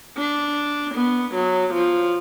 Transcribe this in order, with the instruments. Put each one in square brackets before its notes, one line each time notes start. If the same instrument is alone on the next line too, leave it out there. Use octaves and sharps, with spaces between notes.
[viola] D4
B3
F#3
F3